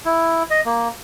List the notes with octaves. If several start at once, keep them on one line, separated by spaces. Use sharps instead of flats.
E4
D#5
A#3